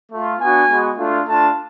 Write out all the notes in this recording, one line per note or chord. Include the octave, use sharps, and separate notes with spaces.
A3 F4
B3 D4 F#4 G#5
G#3 B3 F#4
A3 D4 F4
A3 D4 F4 A5